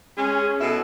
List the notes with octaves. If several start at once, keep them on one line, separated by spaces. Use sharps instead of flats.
G#3 C#4
B2 E4 A4